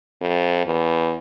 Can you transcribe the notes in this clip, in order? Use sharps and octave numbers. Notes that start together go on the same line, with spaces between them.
F2
E2